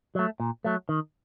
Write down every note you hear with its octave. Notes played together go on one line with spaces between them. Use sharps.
F#3 A3
A#2
F#3 A3
D#3